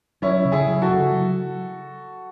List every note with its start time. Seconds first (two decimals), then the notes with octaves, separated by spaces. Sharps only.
0.22 F#3 C#4 E4
0.45 C#3
0.52 E4 G#4
0.67 F#3
0.82 F#4 A4
0.89 C#3
1.12 F#3